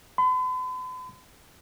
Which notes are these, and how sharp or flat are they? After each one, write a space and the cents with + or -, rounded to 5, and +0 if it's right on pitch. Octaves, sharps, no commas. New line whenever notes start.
B5 +45